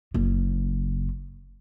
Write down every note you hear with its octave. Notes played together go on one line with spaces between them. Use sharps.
F#1 C#3